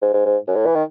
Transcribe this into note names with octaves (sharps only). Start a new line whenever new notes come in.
G#2
G#2
G#2
F#2
A2
E3
D#3